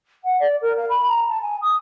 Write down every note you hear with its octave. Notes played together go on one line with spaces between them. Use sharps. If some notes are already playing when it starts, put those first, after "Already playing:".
F#5
D5
A#4
F5
B5
A#5
A5
G#5
D#6